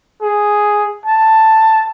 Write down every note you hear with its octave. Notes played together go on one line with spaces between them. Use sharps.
G#4
A5